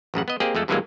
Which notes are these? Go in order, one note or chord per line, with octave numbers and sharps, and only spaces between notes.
A1 F#2 C#3 F#5
B3 D#5
A#3 C4 G4 G#4 D#5
F2 G#3 A3 A4
G2 C3 E3 F#3 G#3 A#3